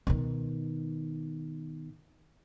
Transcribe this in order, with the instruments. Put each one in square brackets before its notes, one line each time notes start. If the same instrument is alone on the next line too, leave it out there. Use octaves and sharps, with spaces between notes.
[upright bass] B2 D#3